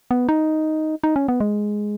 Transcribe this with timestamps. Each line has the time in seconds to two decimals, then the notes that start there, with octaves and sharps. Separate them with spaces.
0.11 B3
0.29 D#4
1.04 D#4
1.16 C#4
1.28 B3
1.40 G#3